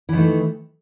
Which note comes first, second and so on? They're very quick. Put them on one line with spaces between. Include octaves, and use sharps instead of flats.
E3 D#3 A3